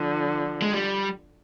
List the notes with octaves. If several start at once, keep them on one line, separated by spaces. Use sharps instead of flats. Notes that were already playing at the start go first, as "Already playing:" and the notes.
Already playing: D3 F3
G#3
G3